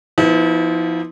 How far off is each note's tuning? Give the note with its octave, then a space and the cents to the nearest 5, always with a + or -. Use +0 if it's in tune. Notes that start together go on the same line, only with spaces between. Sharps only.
F3 -15 B3 +0 E4 -45